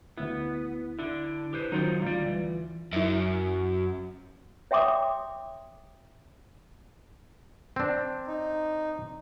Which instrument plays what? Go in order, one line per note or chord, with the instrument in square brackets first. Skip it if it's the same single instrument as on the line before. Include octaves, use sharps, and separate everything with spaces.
[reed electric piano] D2 E4 [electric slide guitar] B3
[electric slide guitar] D3 D4 [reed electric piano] E4
[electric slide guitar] G4 B4 C5
[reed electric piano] D#3 F#3 C#4 [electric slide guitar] D#4 F4 C5
[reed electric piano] D2 F4 [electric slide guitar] G3 D5
[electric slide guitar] E3
[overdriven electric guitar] F#2 [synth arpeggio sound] E4 E5
[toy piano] C#5 E5 G5 C6 D6 D#6
[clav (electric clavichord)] C4 D4
[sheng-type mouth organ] D#4